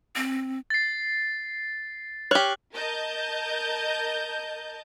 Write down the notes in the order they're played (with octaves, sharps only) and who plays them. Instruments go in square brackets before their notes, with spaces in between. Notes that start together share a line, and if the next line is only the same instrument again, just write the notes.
[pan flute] C4
[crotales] A6 C7
[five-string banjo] G4 C#5 [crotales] F6 F#6 F#7
[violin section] A#4 D#5 A5 G6